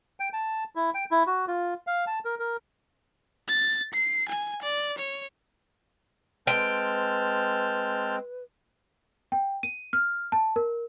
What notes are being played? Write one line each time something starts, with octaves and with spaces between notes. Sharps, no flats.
G5
A5
E4
G5
E4
F#4
F4
F5
A5
A#4
A#4
A6
C7
G#5
D5
C#5
G#3 C4 B4 G5 A5 F6 G6
G5
D#7
F6
A5
A#4